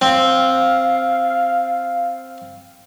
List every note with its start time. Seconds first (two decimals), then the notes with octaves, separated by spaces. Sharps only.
0.02 C4 F5